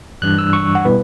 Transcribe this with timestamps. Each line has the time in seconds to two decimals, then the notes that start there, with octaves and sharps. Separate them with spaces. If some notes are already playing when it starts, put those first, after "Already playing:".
0.22 G2 E3 G3 D4 F#6
0.38 E6
0.53 C#6
0.75 F#5
0.85 B2 G3 B3 E4 B4